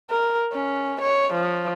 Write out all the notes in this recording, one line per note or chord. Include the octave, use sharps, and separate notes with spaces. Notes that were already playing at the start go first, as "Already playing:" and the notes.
A#4
C#4
C#5
F3